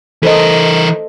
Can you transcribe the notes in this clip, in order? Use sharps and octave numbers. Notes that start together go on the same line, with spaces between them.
E3 A4 A#4 C5 D#5